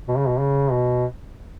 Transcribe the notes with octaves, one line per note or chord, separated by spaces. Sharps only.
B2
C#3
B2
C#3
B2